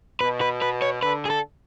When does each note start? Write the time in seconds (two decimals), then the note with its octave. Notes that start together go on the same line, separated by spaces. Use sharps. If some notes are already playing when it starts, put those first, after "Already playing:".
0.21 B2 B4
0.41 B4
0.62 B4
0.82 C#5
1.03 D3 B4
1.25 G#4
1.30 A4